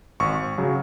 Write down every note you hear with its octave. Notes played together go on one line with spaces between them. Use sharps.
G#1 C#6
C#3 F#3